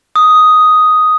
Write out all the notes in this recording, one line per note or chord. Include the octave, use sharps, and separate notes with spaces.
D#6